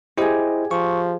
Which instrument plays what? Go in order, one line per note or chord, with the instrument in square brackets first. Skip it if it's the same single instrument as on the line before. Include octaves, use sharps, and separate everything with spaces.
[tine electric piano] E4 C5 D#5 [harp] G4 G#4
[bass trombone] F3 [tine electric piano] C#6